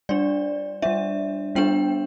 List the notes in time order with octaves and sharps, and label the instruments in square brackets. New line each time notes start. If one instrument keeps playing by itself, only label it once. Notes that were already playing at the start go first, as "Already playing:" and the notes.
[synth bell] G3 D4 D5
G3 D4 E5
G3 B3 D4 G5